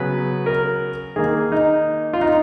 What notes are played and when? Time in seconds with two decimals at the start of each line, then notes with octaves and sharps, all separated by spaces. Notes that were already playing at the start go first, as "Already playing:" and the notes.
Already playing: C#3 F#3 B3 B4
0.46 A#4
1.16 D#3 A#3 G#4
1.52 D#4
2.13 F4
2.21 D#4